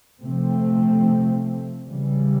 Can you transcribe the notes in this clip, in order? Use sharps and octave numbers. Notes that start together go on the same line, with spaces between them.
C3 F3 A3 C4
C#3 E3 G3